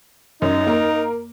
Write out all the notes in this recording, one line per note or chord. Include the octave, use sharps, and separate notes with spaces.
F#2 D#4
A#3 A#4